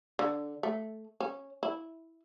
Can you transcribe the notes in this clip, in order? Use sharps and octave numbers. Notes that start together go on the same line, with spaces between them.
D3
A3
C#4
E4